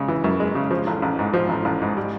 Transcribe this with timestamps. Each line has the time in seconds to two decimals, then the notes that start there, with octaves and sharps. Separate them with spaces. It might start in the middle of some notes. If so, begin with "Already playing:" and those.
Already playing: C#3 G#3
0.08 E3
0.24 F#2
0.40 G#3
0.55 C#3
0.71 F3
0.87 A1
1.02 A1
1.19 G#2
1.34 F3
1.49 A1
1.65 A1
1.82 G#2
1.97 G3